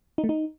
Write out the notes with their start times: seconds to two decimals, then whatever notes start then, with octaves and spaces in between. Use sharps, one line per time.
0.18 D#4
0.24 A3
0.29 D#4